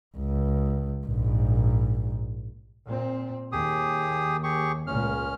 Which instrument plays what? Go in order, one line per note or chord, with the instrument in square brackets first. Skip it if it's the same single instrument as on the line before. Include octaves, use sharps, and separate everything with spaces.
[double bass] C#2
A#1 G#2
[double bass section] A#2 C4
[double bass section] D#2 [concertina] G4 G#4 D#6
[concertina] G4 G#4 C#6
[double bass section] C#2 A#2 [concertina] C#4 F6